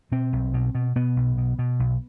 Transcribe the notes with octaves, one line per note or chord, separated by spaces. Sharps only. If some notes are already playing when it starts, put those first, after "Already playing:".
B2 C4
B1
B2
B2
B2 B3
B1
B2
B2
B1